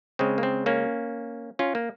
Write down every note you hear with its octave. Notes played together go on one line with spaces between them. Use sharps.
C#3 G#3 C4
A#3
C4
A#3 C#4
C#4 F4
A#3